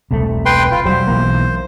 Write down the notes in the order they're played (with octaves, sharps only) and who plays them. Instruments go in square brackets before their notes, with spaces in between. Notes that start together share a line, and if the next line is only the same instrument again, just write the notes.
[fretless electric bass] E1 C2 A3
[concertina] B4 G5 C6
F4
[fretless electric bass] E1 F#3 G3 [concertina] C5
[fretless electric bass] B1 E3 A#3